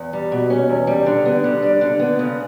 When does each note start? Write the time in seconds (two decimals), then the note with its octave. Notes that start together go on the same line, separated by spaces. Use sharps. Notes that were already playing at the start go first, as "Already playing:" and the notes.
Already playing: E2
0.13 G3
0.32 B2
0.50 C#4
0.69 E2
0.87 G3
1.06 D3
1.26 B3
1.44 G3
1.62 D4
1.81 D3
2.00 B3
2.19 C#3